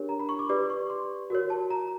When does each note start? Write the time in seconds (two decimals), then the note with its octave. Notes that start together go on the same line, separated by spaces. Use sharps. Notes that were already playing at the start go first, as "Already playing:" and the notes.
Already playing: D4 G4 A#4 C#5
0.09 A#5
0.19 B5
0.29 C#6
0.39 D6
0.49 G4 B4 D5 D6
0.70 C#6
0.90 C6
1.30 F#4 A#4 C#5
1.50 A5
1.71 A#5